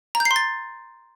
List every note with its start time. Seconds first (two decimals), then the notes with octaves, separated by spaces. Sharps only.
0.15 A#5
0.20 G6
0.25 C7
0.31 C6
0.36 A6